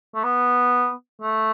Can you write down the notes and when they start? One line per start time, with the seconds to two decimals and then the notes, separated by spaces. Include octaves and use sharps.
0.14 A3
0.24 B3
1.21 A3